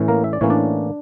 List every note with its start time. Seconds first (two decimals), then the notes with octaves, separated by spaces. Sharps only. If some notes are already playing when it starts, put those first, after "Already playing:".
Already playing: A2 E3 C#4
0.08 A#3 A#4
0.24 E5
0.33 D5
0.41 A2 E3 A#3 C#4 C#5
0.50 D4 D5